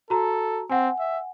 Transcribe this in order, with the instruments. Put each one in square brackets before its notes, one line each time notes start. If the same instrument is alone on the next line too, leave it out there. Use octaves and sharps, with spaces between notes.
[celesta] F#4 A#5 [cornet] A4
[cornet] C4 [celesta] F#5 G#5
[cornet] E5